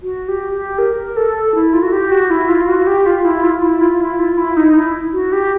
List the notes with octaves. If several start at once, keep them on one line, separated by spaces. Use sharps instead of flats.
F#4
G4
G4
A#4
A4
E4
F4
F#4
G4
F#4
E4
F4
F#4
G4
F4
E4
F4
E4
F4
E4
F4
E4
D#4
E4
F#4
G4